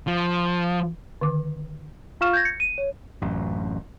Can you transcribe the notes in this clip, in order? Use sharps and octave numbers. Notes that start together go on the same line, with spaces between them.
F3
D3 D#3 D6
F4 F5 C#6 F6 E7
G6 G#6 A#6
C#7
D#7
C#5
A1 F#2